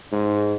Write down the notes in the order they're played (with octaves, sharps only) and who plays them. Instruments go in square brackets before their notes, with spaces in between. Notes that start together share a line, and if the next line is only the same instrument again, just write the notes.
[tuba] G#2